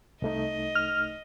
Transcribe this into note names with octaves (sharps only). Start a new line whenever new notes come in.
C2 A3 D#4 D#5
F6